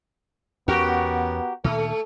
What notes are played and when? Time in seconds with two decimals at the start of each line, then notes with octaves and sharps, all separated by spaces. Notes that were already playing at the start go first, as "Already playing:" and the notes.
0.68 E2 B3 C#4 F#4 G4 A#4
1.64 D2 A#2 D#3 A3 A4